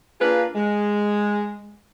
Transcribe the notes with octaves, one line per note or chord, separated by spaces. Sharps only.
A#3 D4 F4 G#4 B4
G#3